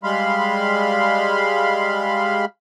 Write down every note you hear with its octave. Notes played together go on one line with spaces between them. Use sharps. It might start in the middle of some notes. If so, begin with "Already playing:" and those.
G3 G#3 F5 B5 C6